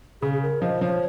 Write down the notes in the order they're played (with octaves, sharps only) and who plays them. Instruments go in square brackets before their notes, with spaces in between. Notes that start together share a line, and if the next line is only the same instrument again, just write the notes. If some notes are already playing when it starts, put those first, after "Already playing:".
[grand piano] C#3 [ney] G#4
[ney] G#4
A#4
[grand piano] F3 [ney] D#5
[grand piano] F3 [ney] C#5